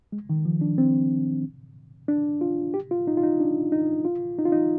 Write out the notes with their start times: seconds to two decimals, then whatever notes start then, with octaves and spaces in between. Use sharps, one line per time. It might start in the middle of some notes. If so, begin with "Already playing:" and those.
0.12 G#3
0.30 D#3
0.45 F3
0.61 D4
0.78 C4
2.08 D4
2.41 F4
2.74 G4
2.91 F4
3.07 D#4
3.17 F4
3.23 D#4
3.40 D4
3.72 D#4
4.05 F4
4.39 D#4
4.45 F4
4.52 D#4